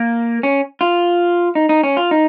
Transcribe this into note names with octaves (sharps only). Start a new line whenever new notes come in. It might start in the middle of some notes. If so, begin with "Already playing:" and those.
Already playing: A#3
C#4
F4
D#4
D#4
C#4
F4
D#4